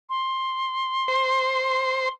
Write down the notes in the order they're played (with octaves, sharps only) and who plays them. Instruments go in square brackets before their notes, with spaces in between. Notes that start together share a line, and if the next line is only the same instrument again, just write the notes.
[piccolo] C6
[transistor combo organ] C5